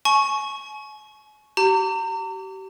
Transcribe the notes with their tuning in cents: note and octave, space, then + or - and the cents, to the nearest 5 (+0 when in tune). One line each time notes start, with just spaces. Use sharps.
G#5 +40 C#6 -5
G4 -35 A#5 -35